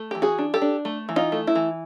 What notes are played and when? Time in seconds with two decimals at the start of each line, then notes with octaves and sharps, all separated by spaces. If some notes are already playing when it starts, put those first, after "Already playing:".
Already playing: A3
0.11 E3 G4
0.22 F#4 G#4
0.38 D4
0.54 G4 A4
0.62 D4
0.85 A3
1.09 E3
1.16 D#4 F4
1.32 A3
1.47 E4
1.55 E3